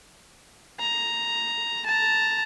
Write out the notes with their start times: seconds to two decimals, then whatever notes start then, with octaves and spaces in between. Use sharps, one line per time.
0.80 A#5
1.85 A5 A#5